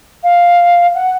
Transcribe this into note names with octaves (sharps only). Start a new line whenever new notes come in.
F5
F#5